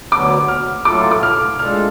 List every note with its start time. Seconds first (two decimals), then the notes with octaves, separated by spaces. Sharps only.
0.12 D2 D3 F#3 B3 D6
0.48 F6
0.85 A2 F#3 A3 F4 A4 D6
1.11 D6
1.23 F6
1.59 A2 G#3 D4 F4 A4 F6